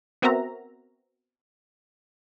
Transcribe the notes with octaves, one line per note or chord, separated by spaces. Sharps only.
B3 C4 F#4 A#4 E5 A#5